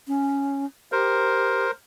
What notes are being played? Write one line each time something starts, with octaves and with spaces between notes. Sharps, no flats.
C#4
G4 A#4 C5